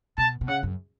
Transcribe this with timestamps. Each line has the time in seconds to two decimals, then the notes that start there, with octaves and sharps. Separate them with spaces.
0.18 B2 A5
0.41 B2
0.48 C#3 F#5
0.63 F#2